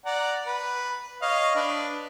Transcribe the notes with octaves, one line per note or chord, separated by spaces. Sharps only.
D5 F#5 A#5
B4
C#5 D#5 F5
D4 B4